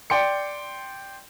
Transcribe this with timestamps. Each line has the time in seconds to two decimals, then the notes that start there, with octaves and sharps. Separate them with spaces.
0.10 D5 G5 C6 C#7